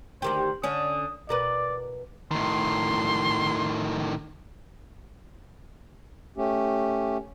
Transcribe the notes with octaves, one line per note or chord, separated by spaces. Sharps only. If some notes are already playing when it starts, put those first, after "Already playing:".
D2 D#3 G4 C5
D3 C#4 D#6
B2 A#4 B4 D5
A2 D#3 C6
A3 C#4 G4